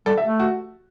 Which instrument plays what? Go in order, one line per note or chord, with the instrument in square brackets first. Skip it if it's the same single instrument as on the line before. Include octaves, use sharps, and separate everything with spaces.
[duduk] G3 [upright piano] A4
[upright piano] E5
[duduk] A3
[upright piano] F#4